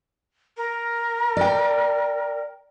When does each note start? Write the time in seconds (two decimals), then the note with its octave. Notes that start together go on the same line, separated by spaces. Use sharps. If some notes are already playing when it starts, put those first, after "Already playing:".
0.57 A#4
1.37 D5 G5